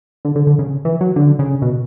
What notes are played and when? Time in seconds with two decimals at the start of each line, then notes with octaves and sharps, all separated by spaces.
0.25 D3
0.36 D3
0.47 D3
0.59 C#3
0.85 E3
1.01 F#3
1.16 D3
1.39 C#3
1.62 B2